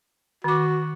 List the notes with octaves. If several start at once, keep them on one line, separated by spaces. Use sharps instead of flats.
D#3 F#4 D6